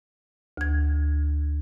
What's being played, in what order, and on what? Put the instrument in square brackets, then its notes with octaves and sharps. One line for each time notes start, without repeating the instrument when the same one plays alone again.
[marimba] D2 G#6